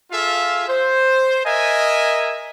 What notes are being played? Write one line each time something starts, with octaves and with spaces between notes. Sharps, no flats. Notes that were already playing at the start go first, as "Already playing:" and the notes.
F4 G#4 A4 E5 F5
C5
A#4 D#5 E5 G#5